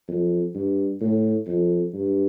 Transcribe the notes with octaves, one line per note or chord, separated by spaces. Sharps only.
F2
G2
A2
F2
G2